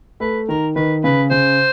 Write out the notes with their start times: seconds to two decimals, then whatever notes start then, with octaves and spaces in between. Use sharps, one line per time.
0.20 A3 B4
0.49 D#3 A#4
0.76 D#3 B4
1.04 C#3 B4
1.30 C#3 C5